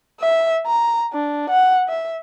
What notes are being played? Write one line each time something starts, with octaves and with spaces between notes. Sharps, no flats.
E5
A#5
D4
F#5
E5